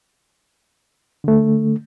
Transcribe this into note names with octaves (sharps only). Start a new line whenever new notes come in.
D3 A3